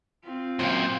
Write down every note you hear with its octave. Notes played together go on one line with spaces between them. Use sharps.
C4 F4
F#2 A#2 C5 F5 G5